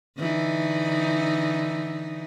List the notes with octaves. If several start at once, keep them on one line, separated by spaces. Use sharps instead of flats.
D3 E3 D#4